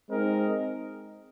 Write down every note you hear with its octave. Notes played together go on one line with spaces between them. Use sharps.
G#3 C4 D#4 A#4 D#5